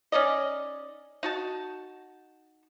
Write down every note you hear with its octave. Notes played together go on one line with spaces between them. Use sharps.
C#4 D#4 D5 D#5
D#4 F#4 A5